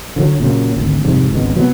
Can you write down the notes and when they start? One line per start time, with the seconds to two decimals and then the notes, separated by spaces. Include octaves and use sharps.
0.16 D3 F3 F#3
0.40 A#2 C#3 F#3
0.76 G#1 D2
1.04 C2 F2 G#2 C3
1.31 G#1 C#2 B2
1.55 C2 F#3 B3